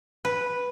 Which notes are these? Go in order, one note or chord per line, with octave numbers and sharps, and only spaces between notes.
B4